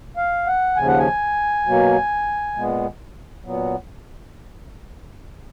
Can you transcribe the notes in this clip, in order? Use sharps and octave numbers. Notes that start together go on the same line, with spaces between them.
F5
F#5
D#2 C#3 F3 G#5
F#5
G#5
B2 F#3 A#3
A#2 G#3 B3
A#2 F#3 B3